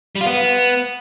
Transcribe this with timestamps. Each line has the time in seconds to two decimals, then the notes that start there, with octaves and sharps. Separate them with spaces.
0.15 G3
0.21 F4
0.26 B3